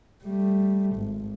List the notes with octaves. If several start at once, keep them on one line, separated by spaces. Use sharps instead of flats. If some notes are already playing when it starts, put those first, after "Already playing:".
G3 A3
G#1